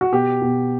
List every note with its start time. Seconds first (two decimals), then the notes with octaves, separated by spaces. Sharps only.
0.01 F#4
0.13 B2 G4
0.42 B2